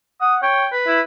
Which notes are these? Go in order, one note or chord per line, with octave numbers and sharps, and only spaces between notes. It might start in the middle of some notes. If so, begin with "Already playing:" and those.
F#5 D#6
C#5 G5
B4
E4